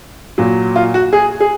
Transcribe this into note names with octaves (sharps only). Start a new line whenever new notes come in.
A#2 F#3
F4
F#4
G#4
G#4